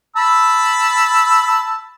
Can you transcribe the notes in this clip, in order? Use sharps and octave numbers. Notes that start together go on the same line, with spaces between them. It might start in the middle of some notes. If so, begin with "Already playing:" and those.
A5 B5 E6